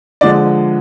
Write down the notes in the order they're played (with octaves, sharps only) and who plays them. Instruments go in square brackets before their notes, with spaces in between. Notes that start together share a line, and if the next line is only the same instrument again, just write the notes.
[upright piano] D3 F3 G#3 D5